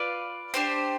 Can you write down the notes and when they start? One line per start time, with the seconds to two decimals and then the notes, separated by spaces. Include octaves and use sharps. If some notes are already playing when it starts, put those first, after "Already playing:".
Already playing: F4 B4 D5 F5
0.54 D4 G4 C5